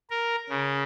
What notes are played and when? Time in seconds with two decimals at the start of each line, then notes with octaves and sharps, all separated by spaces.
0.10 A#4
0.49 C#3